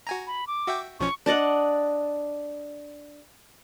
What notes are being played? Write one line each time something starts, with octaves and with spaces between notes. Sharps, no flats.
F#4 G#5 A#5
B5
D6
F#4 E5 G5
B1 F3 C#4 C#6
D4 D5 D#5 F#5